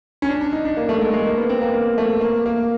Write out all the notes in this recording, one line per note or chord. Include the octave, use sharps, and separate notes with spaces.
C#4
D4
D4
D#4
D4
A#3
A3
G#3
G#3
A#3
B3
C4
A#3
A#3
A3
A#3
A#3